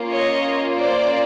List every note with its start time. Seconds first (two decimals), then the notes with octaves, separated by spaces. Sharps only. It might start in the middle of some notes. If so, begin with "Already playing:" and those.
Already playing: A#3 C#4 F4
0.10 C#5 D#5
0.79 C5 D5